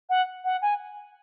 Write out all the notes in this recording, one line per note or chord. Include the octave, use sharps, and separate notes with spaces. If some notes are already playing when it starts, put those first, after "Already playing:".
F#5
F#5
G#5